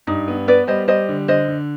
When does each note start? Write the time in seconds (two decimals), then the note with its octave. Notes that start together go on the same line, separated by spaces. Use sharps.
0.07 G2 D#4
0.28 B3
0.47 B3 B4 D5
0.67 G3 C5 D#5
0.88 G3 C5 D#5
1.09 D3
1.28 D3 C5 D#5
1.48 D3